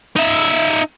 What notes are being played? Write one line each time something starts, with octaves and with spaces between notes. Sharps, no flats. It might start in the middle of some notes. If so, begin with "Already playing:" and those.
D#4 E5